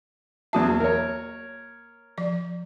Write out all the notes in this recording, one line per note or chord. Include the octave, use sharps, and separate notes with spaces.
E2 F#3 A#3 F#4 E5 A5
A#4 C#5
F3 D5